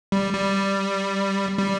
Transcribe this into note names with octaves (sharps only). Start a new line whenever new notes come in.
G3
G3
G3